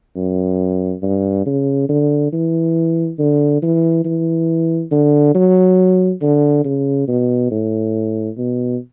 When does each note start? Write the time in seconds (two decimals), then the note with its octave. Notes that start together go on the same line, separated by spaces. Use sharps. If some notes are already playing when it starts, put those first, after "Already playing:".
0.16 F#2
1.03 G2
1.46 C#3
1.89 D3
2.33 E3
3.19 D3
3.62 E3
4.05 E3
4.92 D3
5.35 F#3
6.22 D3
6.65 C#3
7.08 B2
7.51 A2
8.38 B2